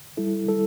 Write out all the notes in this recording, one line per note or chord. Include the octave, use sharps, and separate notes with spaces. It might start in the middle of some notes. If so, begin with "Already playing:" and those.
G3 E4 A4
G3 E4 A4